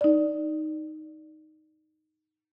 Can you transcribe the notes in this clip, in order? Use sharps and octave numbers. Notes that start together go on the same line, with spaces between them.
D#4 D5